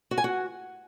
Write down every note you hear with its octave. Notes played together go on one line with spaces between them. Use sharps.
F#4
G#5
F#4